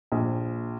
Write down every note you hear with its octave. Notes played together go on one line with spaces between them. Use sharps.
A#1